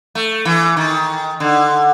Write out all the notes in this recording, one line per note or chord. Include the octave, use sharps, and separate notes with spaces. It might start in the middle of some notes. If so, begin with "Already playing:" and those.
A3
E3
D#3
D3